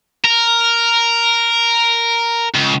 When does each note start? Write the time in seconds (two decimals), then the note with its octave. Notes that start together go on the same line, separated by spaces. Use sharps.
0.25 A#4
2.55 C#2